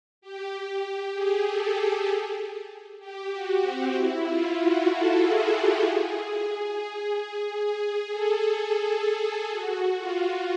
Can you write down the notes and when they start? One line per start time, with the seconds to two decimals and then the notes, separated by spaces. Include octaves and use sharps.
0.21 G4
1.14 G#4
1.46 A4
3.00 G4
3.31 F#4
3.62 C4
3.93 E4
4.23 F4
4.55 F#4
4.86 A4
5.17 G#4
5.47 G4
5.78 G#4
7.65 G#4
8.12 A4
8.57 G#4
9.50 F#4
9.98 F4